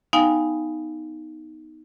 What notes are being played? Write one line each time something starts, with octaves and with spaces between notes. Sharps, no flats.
B3 D#4 F5 G5 G#5